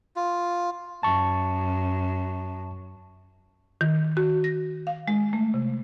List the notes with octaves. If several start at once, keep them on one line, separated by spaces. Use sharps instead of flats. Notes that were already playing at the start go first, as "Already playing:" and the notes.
F4
F#2 A5 C#6
D#3
F#4
A#6
F5
G#3
A3
C3